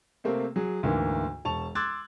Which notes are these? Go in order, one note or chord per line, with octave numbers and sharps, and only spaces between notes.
C3 A3 A#3 C4
F#3 G#4
D2 G#2 D3 E3 A#3
E1 A5 C#6 F7
C6 D6 E6 F#6 G#6 A6